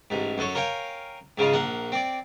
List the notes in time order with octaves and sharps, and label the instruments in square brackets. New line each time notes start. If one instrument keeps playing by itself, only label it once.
[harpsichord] A1 G#2
F#2 A4 C#5
A#4 C#5 F5 G5 G#5
G#2 C#3 G#3 F4
A#1 A#3 F#5
C4 D5